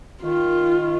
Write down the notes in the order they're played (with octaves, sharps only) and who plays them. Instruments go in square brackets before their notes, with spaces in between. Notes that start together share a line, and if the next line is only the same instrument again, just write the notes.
[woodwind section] D#3 [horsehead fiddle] F4